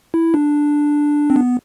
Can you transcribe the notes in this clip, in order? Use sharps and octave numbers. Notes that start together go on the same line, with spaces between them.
E4
D4
C4
B3